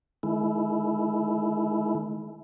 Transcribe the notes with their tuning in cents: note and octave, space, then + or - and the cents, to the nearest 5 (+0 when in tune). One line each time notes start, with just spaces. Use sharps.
D#3 +0 G#3 +40 E4 +0